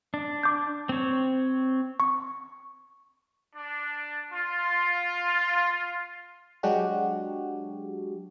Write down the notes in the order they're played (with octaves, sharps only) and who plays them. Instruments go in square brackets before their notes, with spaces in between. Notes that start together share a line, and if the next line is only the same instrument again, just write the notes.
[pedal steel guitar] D4
[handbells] D6 G6
[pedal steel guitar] C4 C#5
[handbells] C#6
[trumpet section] D4
F4
[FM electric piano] F#3 G#3 D4 F#4 G4